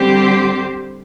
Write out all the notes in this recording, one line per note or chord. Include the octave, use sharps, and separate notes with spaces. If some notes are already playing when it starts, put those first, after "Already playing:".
Already playing: D3 G3 C4 G4 C5